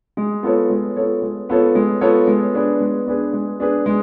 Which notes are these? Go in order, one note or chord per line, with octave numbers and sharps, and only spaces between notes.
G#3
B3 F4 A4 C#5
G#3
B3 F4 A4 C#5
G#3
B3 F4 A4 C#5
G#3
B3 F4 A4 C#5
G#3
B3 D4 G#4 B4
G#3
B3 D4 G#4 B4
G#3
B3 D4 G#4 B4
G#3